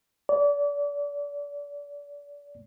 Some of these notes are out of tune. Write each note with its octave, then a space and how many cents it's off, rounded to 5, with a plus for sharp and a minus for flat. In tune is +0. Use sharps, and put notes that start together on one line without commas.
D5 -30